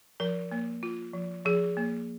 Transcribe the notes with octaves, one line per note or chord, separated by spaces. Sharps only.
F3 A#4
A#3
F4
F3
F3 G#4
A#3